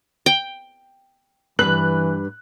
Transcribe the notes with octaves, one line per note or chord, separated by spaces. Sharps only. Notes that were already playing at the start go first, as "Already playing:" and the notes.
G5
G2 E3 B4 F#6 F#7